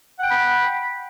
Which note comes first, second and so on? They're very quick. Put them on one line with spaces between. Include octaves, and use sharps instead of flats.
F#5 G5 B5